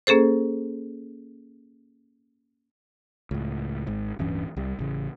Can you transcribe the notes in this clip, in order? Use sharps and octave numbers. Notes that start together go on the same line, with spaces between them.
A#3 C#4 G#4 A4 C5
C#2 A2
G#1 G#2
D1 G2 E3 C#4
C2 G3
A1 C#3